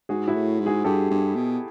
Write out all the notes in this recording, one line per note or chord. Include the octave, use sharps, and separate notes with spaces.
G#2 F#4 G#4
E4 F#4
A2
G#2
F#4 G#4
G2 G4 A4
G2
B2